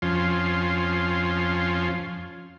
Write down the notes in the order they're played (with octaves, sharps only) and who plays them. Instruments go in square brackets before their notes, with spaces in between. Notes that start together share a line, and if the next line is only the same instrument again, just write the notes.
[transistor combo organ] F2 F3 C#4 F4 C6